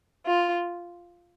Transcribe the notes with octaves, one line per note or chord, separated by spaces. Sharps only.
F4